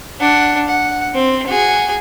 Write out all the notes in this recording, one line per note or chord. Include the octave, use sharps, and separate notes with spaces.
D4 F#5
F#5
C4
F#4 G#4